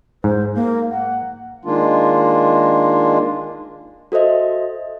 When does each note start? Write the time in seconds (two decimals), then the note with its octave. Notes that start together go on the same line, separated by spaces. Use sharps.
0.24 G#2 C5
0.55 A#3
0.91 F#5
1.65 D#3 G#3 A#3 D4 F4
4.12 F#4 A4 C5 D#5 E5